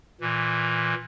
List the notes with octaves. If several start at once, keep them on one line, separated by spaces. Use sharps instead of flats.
A#2 E3